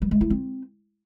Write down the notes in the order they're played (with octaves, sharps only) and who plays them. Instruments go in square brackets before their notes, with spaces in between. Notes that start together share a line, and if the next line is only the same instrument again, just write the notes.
[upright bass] G3
G#3
E4
C4